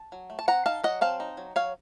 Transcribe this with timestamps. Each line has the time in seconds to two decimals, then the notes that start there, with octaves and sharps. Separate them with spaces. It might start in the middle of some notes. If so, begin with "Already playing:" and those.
Already playing: A5
0.12 F#3
0.30 A3
0.39 A5
0.48 C4 F#5 A#5
0.66 D#4 F5 A5
0.84 F#3 D#5 F#5
1.01 C4 F5 A5
1.20 D#4
1.37 F#3
1.56 F#3 C#5 F5